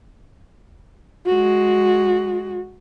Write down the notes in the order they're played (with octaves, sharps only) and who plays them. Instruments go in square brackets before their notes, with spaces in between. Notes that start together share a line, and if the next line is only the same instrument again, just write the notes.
[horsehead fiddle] G#3 F#4